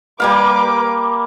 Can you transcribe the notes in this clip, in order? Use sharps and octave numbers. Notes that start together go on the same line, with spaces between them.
G3 A#3 B4 F5 D6